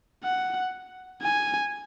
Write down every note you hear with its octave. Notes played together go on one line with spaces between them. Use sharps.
F#5
G#5